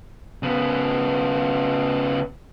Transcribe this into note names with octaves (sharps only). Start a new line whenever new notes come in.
C#3 B3